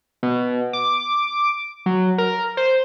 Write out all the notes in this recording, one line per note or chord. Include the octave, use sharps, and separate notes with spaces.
B2
D6
F#3
A#4
C5